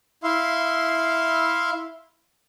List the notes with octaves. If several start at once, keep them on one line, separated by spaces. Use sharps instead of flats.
E4 E5 F5 C6